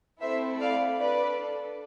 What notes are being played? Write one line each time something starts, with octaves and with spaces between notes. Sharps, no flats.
A3 C4 E4 A4 C5 E5
D5 F5
D4 A4 B4 D5